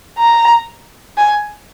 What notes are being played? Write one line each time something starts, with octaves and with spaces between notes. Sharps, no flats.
A#5
G#5